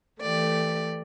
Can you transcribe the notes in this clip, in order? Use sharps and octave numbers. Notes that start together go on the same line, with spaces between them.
E3 A3 G4 D5